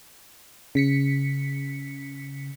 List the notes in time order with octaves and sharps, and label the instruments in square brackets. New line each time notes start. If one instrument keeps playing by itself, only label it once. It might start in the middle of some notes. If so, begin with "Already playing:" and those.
[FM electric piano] C#3 B6 C#7